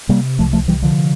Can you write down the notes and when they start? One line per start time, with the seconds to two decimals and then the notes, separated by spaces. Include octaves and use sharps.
0.09 C3 G3 A#3
0.39 C2 F3 A3
0.53 F3 A3
0.68 C3 E3 G3
0.82 D3 F3